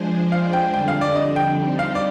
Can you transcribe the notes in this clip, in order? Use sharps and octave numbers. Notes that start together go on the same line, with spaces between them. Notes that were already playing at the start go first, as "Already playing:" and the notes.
Already playing: F3 G#3 D4 G#4 C5
F5
G5
F2 D3 G3 D4 G5
F5
D5
D#5
G5
G3 C4 D#4 G4
F5
D5